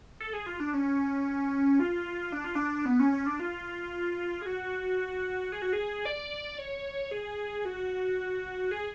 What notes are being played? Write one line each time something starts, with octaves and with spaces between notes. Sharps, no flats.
A4
G#4
F4
D4
C#4
F4
D4
F4
D4
B3
C#4
C#4
D4
F4
G#4
F#4
G#4
F#4
G#4
D5
C#5
G#4
F#4
G#4